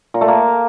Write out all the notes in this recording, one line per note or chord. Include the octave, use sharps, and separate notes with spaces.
A#2
A3
A#3